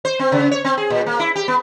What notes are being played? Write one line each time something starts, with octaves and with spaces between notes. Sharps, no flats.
C5
C4
C#3
C#5
C4
G#4
A#2
A#3
E4
G4
B3